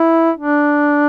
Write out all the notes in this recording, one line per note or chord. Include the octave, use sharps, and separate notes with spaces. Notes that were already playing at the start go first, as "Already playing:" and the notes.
Already playing: E4
D4